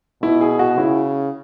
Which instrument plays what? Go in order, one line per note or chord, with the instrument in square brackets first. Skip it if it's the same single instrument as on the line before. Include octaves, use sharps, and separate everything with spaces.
[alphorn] B2 [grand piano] E4
[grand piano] G#4
F#4
[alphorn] C#3 [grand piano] E4